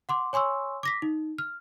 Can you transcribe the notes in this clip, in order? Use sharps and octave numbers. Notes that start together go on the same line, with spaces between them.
F#5 C6 D6
C#5 G#5 C6 C#6 E6
D6 A#6 B6
D#4
F6